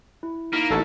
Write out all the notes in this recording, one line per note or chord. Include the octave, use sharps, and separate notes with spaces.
E4
A#3 D#4 E4 B6
A1 F#4 G#4 A4